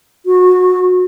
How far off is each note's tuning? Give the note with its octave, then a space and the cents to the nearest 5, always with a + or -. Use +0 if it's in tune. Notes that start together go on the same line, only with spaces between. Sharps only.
F#4 -20